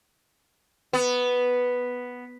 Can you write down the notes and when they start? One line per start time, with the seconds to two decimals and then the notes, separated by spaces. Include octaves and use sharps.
0.93 B3